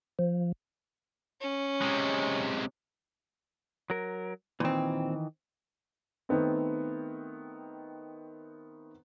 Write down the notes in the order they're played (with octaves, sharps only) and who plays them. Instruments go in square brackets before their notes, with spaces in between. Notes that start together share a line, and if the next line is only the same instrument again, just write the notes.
[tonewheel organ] F3
[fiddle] C#4
[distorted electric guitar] C3 G#3
[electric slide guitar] F#3 A#4
[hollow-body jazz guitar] A#2 C4 [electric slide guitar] D#3 E3
[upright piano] D#3 A3 B3 C4